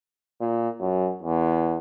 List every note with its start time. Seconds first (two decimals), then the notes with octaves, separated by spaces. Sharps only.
0.41 A#2
0.81 F#2
1.22 E2